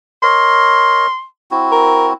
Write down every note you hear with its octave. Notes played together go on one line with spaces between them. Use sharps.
A#4 C#5 D#5 C6
C4 E4 F#4
A#4